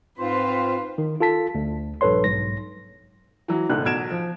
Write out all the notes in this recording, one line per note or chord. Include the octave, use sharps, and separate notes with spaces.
G#2 C4 F4 B4 C5 F5
D#3
F4 A4 A5 B6
D2
A#1 G2 A4 B4 C#5 C6
B1 G#2 A#6
E3 F#3
E1 C#2 G#2 A3 F#6
B1 F#3 G#6 D7 E7
F3